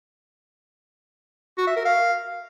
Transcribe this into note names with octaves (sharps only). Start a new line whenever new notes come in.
F#4
E5
A#4
F5